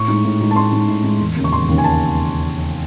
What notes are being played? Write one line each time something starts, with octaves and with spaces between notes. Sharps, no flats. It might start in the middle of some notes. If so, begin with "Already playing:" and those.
Already playing: A2 C#6
G#3 D#4
A2
G#3 D#4
A5
A2 C6
G#3 D#4
A2
G#3 D#4
E1
D#2 C#3
C#6
E1 C6
D#2 C#3
G#5
A5